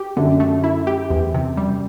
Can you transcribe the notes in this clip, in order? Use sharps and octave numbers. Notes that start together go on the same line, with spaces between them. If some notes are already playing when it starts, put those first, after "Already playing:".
Already playing: G4
F#2 D3
A3
E4
G4
E2
C3
G3